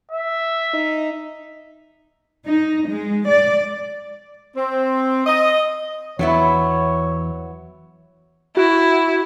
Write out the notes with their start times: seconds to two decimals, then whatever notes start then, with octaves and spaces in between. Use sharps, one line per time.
0.12 E5
0.74 D#4
2.47 D#4
2.88 G#3
3.28 D5
4.57 C4
5.26 D#5
6.19 E2 F#3 B3 E4 C#5
8.57 E4 F#4